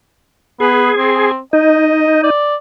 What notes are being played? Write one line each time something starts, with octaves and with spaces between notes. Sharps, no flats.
B3 G#4
C4
D#4 D#5
D5